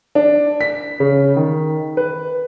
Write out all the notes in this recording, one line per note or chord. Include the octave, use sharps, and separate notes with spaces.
D4
B6
C#3
D#3
B4